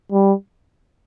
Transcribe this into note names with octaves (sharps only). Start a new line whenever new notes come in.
G3